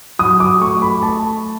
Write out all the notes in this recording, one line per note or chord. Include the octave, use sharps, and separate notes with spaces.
F#3 D#6
D6
A3 C#6
B5
A3 A5